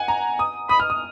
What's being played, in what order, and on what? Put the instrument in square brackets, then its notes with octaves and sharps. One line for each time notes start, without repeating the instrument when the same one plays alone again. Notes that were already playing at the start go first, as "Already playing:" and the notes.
Already playing: [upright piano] F#5 G#5
A#5
D#6
[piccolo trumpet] B5 [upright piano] D#6
[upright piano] F6
D#6